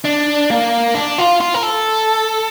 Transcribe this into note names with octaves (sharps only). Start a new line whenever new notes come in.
D4
A#3
D4
F4
F4
A#4
A4